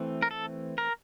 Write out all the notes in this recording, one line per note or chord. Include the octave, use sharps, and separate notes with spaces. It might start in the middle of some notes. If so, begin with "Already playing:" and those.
Already playing: E3 A3 C4
A#4
A4
A#4